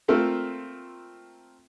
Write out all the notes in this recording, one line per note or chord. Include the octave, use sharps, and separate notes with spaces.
A3 A#3 C4 F4 A4 A#4